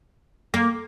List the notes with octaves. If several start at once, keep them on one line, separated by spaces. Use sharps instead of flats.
A#3